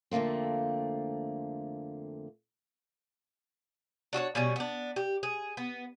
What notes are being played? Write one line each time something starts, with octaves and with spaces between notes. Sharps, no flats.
F2 D3 A3 A#3 C4
D4 F#4 A4 C#5
B2 G3 C#4 G#4
B3 D4
G4
G#4
B3